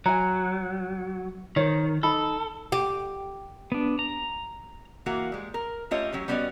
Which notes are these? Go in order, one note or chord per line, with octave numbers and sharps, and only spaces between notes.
F#3 G#5 A#5
D#3 A#4 C5 C#5
D#4 A4 B5
G4
B3 D4
A#5
E3 A#3 F#4
G3 G#3
A#4
A3 C#4 F4 G4 C#5 D#5
F#3 C#4 G4
G3 B3 C#4 F#4 D5 D#5